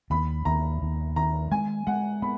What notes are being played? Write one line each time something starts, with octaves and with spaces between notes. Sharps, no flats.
D#2 B5
D#2 A#5
D#2
D#3 A#5
G#3 G#5
G#3 F#5
B3 B5